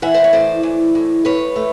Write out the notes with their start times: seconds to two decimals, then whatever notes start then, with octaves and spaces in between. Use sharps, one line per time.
0.02 E3 E5 F#5
0.14 C5
0.24 C#5
0.33 A2 C5 D5
0.63 E3
0.95 A2
1.25 A2 B4 C#5
1.56 A3